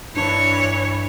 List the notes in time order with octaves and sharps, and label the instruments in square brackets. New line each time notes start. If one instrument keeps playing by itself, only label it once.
[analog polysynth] G2 D4 [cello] E3 C#5